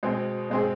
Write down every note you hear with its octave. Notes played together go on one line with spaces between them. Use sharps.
B2 G#3 C4 G#4
B2 G#3 C4 G#4